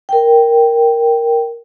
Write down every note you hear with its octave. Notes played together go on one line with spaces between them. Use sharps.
A#4 G5